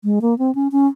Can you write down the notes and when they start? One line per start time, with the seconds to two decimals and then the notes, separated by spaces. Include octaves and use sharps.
0.04 G#3
0.22 A#3
0.38 C4
0.55 C#4
0.72 C#4